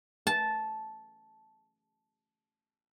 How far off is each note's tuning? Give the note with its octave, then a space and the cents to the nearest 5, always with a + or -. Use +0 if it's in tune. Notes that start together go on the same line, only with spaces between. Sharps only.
A5 -10